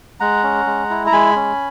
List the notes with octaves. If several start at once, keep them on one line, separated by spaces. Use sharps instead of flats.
G#3 F#5 A#5
C#4
G#3
E4
A#5
G#3 G#5 B5
C#4